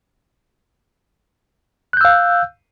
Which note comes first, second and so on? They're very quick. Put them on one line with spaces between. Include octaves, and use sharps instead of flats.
F#6 G6 E6 F5